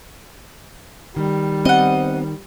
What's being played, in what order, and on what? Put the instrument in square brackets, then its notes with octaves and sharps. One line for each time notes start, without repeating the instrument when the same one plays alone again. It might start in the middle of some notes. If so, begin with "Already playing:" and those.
[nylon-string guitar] D#3 [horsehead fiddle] G3
[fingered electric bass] B3 C4 [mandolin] D#5 F#5